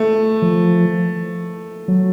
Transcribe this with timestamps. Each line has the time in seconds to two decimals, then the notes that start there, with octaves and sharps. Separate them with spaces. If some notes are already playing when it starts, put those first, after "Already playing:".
Already playing: A3
0.42 F3
1.88 F#3